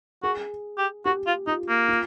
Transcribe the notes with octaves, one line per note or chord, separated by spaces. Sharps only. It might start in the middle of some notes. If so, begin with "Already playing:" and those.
F#4 G#4
G4
F#4 G4
F4
D#4 F4
A#3
F4